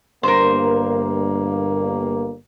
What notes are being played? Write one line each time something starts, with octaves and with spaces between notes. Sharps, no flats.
G1 G2 A#3 A#4 C5